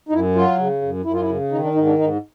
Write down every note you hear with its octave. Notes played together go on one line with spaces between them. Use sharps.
D#4
F#2 E4
F#3 F4
C#3
F#2
F#2 E4
F4
E4
C#3
D#3 D#4
D4
G#2 D#4
D4
G#2 D#4